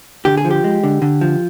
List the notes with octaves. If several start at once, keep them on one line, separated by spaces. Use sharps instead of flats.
D3 G4
G#4
F3
G4
G#3
D3
D3
F3